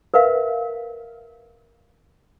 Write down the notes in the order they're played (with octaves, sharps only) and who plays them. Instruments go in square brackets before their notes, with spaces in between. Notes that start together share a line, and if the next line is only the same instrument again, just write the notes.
[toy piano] A#4 B4 E5 F5